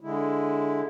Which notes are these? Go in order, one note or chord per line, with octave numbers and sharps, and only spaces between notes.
D3 G#3 E4